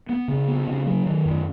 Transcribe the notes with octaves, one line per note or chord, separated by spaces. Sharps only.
B3
C#3
B3
C#3
F#3
D#3
F#2